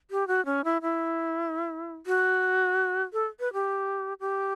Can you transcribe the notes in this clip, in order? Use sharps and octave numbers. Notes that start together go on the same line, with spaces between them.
G4
F#4
C#4
E4
E4
F#4
A4
B4
G4
G4